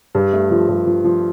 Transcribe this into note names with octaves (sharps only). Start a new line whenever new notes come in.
G2
A3
F3
G2
F3
F3